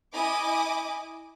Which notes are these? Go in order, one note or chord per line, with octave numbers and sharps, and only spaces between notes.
E4 D#5 G#5 D6 D#6